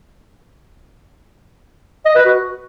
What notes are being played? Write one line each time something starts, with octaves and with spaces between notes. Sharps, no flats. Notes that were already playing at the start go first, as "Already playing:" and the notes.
D#5
B4
F#4